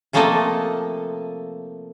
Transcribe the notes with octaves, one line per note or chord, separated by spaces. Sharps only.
C3 F3 A3 A#3 A4 D#5